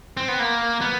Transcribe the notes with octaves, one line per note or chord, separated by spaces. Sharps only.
C4
B3
A#3
B3